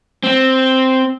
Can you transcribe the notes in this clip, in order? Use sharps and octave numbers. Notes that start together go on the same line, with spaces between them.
C4